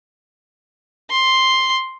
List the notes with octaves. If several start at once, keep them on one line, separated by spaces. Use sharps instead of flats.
C6